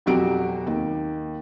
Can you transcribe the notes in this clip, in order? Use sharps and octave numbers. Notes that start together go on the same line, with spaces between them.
E1 F2 F#3 F#4 G4 D7
D#2